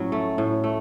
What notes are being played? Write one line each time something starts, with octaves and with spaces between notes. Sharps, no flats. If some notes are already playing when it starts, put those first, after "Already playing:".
Already playing: A2 F#3 C#4
A3
A2
A3